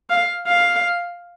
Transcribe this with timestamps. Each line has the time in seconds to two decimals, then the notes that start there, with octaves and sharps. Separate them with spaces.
0.10 F5
0.47 F5